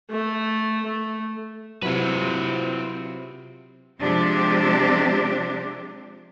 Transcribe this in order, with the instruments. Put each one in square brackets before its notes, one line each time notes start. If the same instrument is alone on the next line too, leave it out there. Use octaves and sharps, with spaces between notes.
[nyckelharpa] A3
A3
[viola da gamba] C3 [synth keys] F#3 E4 F4 [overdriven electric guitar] C4 B4
[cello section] C3 F3 G#3 C4 D4 G4